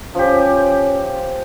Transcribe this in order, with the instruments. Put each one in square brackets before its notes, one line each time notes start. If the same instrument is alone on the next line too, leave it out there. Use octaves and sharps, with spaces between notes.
[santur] F3 G4 [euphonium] C#4